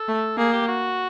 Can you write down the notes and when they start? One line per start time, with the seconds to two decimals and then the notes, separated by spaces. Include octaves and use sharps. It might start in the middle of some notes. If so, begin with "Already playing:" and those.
Already playing: A4
0.08 A3
0.37 A#3 G#4
0.52 G4
0.68 F#4